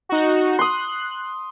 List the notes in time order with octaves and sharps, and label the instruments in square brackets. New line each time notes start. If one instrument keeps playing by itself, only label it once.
[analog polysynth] D#4 F#4
[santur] C6 D#6 [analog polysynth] F#6